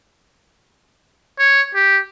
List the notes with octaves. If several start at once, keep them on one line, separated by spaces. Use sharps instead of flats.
C#5
G4